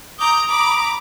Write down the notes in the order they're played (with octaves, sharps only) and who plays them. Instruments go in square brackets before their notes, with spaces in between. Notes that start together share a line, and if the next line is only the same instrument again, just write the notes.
[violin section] A#5 D6 G6 [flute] D#6
[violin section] A#5 B5 D6